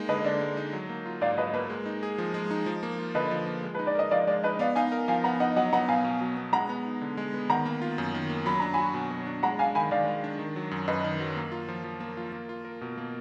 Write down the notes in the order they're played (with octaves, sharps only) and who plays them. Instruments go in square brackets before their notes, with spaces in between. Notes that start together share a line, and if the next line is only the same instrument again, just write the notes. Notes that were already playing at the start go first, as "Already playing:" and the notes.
Already playing: [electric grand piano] G#3 A#3 D#4
[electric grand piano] D3 [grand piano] B4 D#5
[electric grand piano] D3 [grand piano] D5
[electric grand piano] G#3
D#4
F#3
A#3
F4
[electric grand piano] G#2 [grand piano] D5 F5
[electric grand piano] F#3 [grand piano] B4 D#5
[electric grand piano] A#3 [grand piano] B4
[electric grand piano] G#3
D#4
G#4
F3
G#3
D#4
F3
A#3
F4
[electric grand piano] D3 [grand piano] B4 D#5
[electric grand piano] F3
A#3
G#3
[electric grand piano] D#4 [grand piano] B4
[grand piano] D5
[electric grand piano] A#4 [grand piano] D#5
[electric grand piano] F3 [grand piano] D5 F5
[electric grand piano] G#3 [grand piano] D5
[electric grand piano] D#4 [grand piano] B4 D#5
[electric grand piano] B3 [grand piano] D5 F5
[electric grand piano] D#4 [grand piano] F5 G#5
[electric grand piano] A#4
[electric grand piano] F3 [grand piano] F5 G#5
[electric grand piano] B3 [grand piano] F#5 A#5
[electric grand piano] D#4 [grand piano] D#5 F#5
[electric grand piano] F#3 [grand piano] D#5 F#5
[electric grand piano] B3 [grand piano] F#5 A#5
[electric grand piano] B2 [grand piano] F5 G#5
[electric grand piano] B2
F#3
B3
[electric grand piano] G#3 [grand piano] F#5 A#5
[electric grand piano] B3
D#4
D3
G#3
B3
[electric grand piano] D#3 [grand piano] F#5 A#5
[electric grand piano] A#3
F4
F#2
D#3
A#3
[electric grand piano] F#3 [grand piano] B5
[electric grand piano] D4 [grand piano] A#5
[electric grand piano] F#4 [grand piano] G#5 B5
[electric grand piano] B2
F#3
D4
[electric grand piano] G#3 [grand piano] F#5 A#5
[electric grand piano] D4 [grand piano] F5 G#5
[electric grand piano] D#3 [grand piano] G#5 B5
[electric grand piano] D#3 [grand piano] D5 F5
[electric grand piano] G#3
D4
D#3
F#3
F#2
[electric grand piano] F#2 [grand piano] B4 D#5
[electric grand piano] D#3
F#3
A#3
F4
F3
F3
A#3
F4
A#3
F4
A#4
B2
A#3